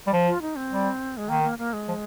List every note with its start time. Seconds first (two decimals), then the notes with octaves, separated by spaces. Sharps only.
0.07 G3
0.13 F3
0.28 F4
0.42 D#4
0.56 C4
0.71 G3
1.17 G#3
1.29 D#3 A#3
1.44 A#3
1.58 A#3
1.73 G#3
1.88 F3